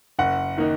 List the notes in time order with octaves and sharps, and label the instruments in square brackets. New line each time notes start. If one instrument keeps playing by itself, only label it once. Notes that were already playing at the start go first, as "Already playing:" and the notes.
[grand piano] F#1 F#5
D#3 A#3 D#4